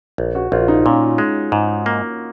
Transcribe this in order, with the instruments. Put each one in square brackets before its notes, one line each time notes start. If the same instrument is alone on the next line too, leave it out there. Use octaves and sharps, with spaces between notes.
[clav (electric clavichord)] A#1
[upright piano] F#4
[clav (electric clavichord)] A#1 [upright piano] F4
[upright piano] D#4
[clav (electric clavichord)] A#2 [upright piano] C#4
[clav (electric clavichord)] G#3
G#2
A#3